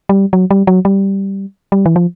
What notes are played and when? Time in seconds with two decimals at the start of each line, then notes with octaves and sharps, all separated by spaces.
0.09 G3
0.33 F#3
0.51 G3
0.67 F#3
0.85 G3
1.72 G3
1.86 E3
1.96 F3